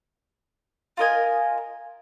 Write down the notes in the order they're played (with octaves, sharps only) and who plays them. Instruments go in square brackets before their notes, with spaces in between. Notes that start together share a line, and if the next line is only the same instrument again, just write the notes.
[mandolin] F4 A#4 D#5 G#5